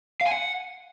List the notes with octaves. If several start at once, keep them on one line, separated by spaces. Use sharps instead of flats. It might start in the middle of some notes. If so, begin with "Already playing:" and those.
F5
G#5
F#5